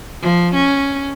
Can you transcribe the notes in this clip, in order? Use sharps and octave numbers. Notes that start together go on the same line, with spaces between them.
F3
C#4